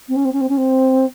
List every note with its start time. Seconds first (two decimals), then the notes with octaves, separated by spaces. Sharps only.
0.08 C4
0.16 C#4
0.25 C4
0.33 C#4
0.41 C4
0.49 C#4
0.57 C4